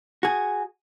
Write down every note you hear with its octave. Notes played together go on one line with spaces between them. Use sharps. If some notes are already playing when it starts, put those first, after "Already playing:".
F#4 G#4